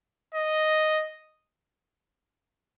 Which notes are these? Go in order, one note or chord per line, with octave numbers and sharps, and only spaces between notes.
D#5